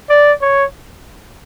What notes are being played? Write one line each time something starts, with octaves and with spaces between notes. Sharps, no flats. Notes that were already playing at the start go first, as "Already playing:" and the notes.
D5
C#5